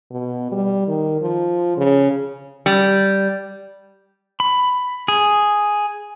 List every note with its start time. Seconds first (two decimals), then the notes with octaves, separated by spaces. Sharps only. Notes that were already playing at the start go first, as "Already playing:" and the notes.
0.11 B2
0.52 G3
0.88 D#3
1.21 F3
1.77 C#3
2.66 G3
4.40 B5
5.08 G#4